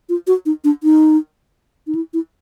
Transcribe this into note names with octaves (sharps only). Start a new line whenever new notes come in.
F4
F#4
D#4
D4
D#4
D#4
E4
E4